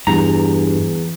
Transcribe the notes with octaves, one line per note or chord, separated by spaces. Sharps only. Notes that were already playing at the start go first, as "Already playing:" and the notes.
E2 G2 A#5